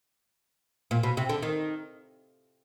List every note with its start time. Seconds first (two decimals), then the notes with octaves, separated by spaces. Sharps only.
0.91 A#2
1.03 B2
1.17 C3
1.29 D3
1.42 D#3